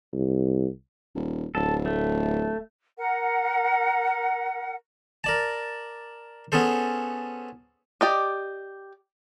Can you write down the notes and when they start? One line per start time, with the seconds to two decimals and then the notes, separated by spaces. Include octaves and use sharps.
0.13 C2
1.15 D#1
1.55 D1 A4
1.86 A3
2.98 A#4 F#5
5.24 A#4 D5 A5
6.52 B3 C#4 G#4 A4 C5
8.01 G4 D5 D#5